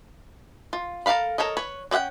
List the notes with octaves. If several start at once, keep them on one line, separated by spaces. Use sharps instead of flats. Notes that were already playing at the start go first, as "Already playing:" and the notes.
F4
A4 A#4 D5 F5 B5
A4 A#4 C#5 D#5
B4 C#5
C#4 D5 E5 F#5 G5